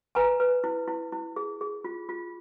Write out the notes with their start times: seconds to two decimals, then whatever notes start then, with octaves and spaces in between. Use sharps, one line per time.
0.15 B4 G#5 A#5
0.40 B4
0.64 E4
0.88 E4
1.12 E4
1.36 G#4
1.61 G#4
1.84 F4
2.09 F4